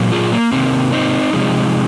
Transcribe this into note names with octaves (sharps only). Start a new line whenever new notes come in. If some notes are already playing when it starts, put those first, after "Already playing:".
Already playing: A#2 F#3 A#3
F4 G#4
A#3
C3 D#3 A#3 C4
C4 D#4
C3 F3 G#3